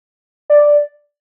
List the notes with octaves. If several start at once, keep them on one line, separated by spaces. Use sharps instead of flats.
D5